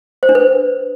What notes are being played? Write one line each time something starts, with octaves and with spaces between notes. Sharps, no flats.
C5
D4
B4